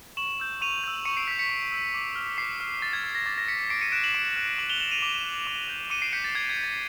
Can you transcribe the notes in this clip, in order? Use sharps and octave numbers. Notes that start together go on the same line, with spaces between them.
C#6 E7 F#7
E6 G6
C#6 D#7 F7
E6 G6
C#6 C#7 D#7
C7 D7
E6 G6 B6 C#7
B6 C#7
C#6
E6 G6
D6
F6
D6 C7
F6
D6 A6
G#6
F6 A6
A#6
D6 A6
A#6
F6 B6 C#7
B6 C#7
D6 C7 D7
C#7 D#7
F#6 D7 E7
E7 F#7
D6 D7 E7
F#6
D6 E7 F#7
F7 G7
F#6 E7 F#7
D#7 F7
D6
F#6
D6
G6
D6 C#7 D#7
C7 D7
G6 B6 C#7
A6
D6 G#6
G#6
G6
A6